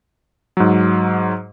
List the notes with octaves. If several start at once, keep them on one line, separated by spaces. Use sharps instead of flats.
G#2 F#3